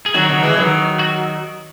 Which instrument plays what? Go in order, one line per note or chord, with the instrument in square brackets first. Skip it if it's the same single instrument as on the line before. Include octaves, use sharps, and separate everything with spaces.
[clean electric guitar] G#4
[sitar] D#3 F#3 [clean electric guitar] F#4
[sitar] D#3 F#3
E3 G#3
D#3 F#3
[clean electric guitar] F#4